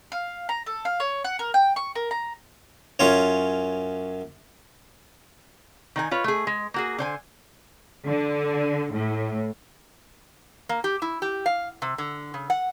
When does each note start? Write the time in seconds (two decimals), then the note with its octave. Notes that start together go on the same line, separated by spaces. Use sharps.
0.12 F5
0.49 A#5
0.66 A4
0.85 F5
1.00 C#5
1.24 F#5
1.39 A#4
1.54 G5
1.76 C#6
1.95 A#4
2.11 A#5
2.99 F#2 C#4 F4 C#5
5.96 D#3 D#4 G#5
6.11 F4 B4 C#5
6.24 A3 G#4
6.47 G#3
6.74 A#3 F#4 G#4
6.99 D3 C5 G#5
8.07 D3
8.92 A2
10.69 A#3
10.84 G4
11.02 E4
11.22 G4
11.46 F5
11.82 C3
11.98 D3
12.34 C#3
12.50 F#5